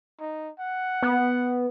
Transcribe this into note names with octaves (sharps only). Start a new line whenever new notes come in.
D#4
F#5
B3